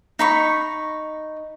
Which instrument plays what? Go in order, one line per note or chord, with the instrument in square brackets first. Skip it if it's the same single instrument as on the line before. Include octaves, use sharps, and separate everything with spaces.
[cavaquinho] D#4 B5 C#6